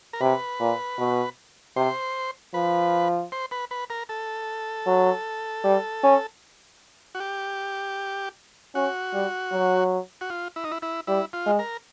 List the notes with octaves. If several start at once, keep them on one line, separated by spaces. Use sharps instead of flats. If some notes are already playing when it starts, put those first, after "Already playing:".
A#4
C3 B4
A#2
B2
C3 C5
F3 B4
C5
B4
B4
A#4
A4
F#3
G3
C#4
F#4
G4
C#4 F#4
G3
F#3
F#4
F4
E4
D#4
E4
E4
G3 E4
F4
G#3
A#4